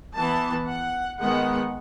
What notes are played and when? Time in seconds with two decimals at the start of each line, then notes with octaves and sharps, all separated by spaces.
0.16 E3 B3 A5
0.67 F#5
1.20 D#3 G#3 B3 F#5